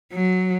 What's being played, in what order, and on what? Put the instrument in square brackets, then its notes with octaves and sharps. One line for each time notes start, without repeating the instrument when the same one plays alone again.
[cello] F#3